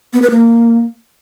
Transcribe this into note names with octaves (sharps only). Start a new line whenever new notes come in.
B3
B4
A#3